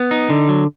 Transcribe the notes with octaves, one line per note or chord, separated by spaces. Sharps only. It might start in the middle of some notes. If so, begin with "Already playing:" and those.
Already playing: B3
D#4
D3
F#3